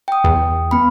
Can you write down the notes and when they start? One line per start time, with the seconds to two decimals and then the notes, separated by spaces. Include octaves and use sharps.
0.08 G5 D#6
0.24 E2
0.71 B3 B5